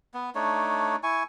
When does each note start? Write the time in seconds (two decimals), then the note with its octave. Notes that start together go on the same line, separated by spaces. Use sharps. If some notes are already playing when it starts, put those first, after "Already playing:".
0.14 B3
0.35 A3 D4 D#4 C#5
1.03 E4 G#5 C#6